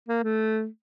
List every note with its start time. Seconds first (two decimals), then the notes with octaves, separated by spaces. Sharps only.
0.08 A#3
0.23 A3